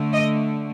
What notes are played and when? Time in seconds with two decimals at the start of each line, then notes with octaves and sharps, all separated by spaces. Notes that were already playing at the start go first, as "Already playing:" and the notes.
Already playing: D3 A3
0.13 D#5